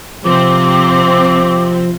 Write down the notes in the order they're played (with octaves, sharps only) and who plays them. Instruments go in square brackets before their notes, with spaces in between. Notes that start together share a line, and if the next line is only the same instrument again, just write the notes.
[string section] C3 C4 [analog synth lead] F3 [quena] D6